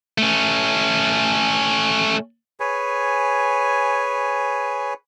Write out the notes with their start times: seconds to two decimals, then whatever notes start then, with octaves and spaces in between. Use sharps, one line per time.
0.18 A3 C#4
2.60 G#4 B4 C#5 G#5